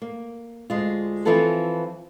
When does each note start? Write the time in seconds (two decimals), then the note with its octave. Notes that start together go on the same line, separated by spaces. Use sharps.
0.02 A#3
0.70 D2 G#3 F4
1.25 E3 F3 C4 F4 A4 B4